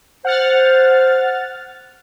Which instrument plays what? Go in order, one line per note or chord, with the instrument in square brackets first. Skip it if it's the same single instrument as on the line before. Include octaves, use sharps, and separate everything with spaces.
[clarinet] C5 [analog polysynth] F#5 F6 A6